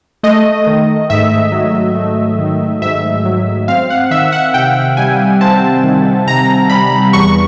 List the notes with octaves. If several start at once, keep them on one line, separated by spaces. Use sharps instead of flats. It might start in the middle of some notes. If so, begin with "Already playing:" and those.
A3 D#5
D#3
G#2 E5
F#3
A3
D#3
G#2 E5
F#3
C4 F5
F#5
D#3 E5
F#5
C3 G5
G3 G#5
C4 A5
D#3
C3 A#5
G3 B5
E2 C#6